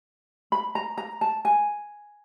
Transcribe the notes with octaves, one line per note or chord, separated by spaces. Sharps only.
B5
A#5
A#5
A5
G#5